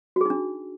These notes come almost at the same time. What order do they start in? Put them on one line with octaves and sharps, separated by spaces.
F#4 G#4 D#4 D4